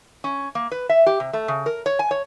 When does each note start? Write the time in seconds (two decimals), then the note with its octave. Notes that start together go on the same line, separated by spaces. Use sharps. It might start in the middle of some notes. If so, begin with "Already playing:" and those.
0.24 C#4
0.55 A#3
0.71 B4
0.89 E5
1.06 G4
1.20 C3
1.33 A3
1.48 C#3
1.66 A#4
1.86 C#5
1.99 G#5
2.11 C#5